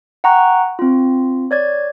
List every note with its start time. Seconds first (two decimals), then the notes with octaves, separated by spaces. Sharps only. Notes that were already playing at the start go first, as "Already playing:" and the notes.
0.24 F#5 G5 A#5 C#6 F#6
0.79 C4 F4
1.51 C#5 D5 G#6